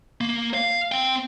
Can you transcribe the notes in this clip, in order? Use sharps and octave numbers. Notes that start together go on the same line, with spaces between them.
A#3
F5
C4 G5